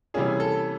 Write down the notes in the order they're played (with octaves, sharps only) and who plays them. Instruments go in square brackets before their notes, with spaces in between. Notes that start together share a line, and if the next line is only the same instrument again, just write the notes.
[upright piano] C3 E3 G3 A#3 C#4 [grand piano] G#4
[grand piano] A4